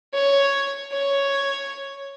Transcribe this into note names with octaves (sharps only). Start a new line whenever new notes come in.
C#5
C#5